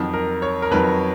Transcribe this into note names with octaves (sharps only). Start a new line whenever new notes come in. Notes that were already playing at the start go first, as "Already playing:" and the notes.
Already playing: F2 D#3 F#3
A#4
C#5
A#4
F2 D#3 F#3 B4